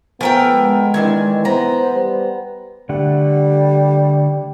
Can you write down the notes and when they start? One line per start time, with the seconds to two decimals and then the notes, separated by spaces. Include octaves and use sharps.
0.21 F3 A3 B3 A#4 G5 G#5
0.53 G#3
0.94 D#3 E3 C4 D4 G#5
1.45 B3 C5 A#5
1.93 G3
2.89 D3 G3 A3 F#5